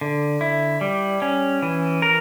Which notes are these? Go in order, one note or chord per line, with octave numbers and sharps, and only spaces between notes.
D3
E4
G3
C#4
E3
A#4